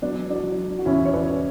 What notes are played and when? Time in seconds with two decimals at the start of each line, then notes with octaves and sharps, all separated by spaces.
0.02 F#3 B3 D4
0.30 D4 F#4
0.43 F#3
0.79 F#4
0.85 E2 C#4 E4
1.05 C#5
1.13 B4 D5